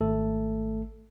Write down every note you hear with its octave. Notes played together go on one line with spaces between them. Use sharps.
G#1 A3 A4